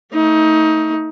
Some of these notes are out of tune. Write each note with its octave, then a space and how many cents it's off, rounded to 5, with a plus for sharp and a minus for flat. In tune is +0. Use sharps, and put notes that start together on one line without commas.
A3 +25 D#4 +25